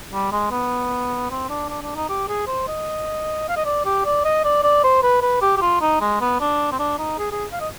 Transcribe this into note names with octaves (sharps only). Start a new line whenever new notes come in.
G3
G#3
B3
C4
D4
D4
D4
D#4
G4
G#4
C5
D#5
F5
D#5
D5
G4
D5
D#5
D5
D5
C5
B4
B4
G4
G4
F4
D#4
G#3
B3
D4
C4
D4
D#4
G#4
G#4
F5
D#5